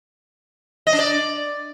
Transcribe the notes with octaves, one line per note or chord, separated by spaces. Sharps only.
D#5
D4
D5